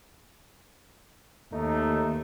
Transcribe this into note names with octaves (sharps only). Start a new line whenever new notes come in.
D#2 A3 D#4